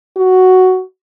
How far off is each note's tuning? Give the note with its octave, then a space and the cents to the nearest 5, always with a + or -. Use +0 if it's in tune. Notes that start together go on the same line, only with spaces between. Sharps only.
F#4 +5